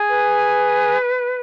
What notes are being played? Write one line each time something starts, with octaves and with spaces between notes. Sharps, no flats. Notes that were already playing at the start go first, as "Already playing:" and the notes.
Already playing: G#4 G#5
B4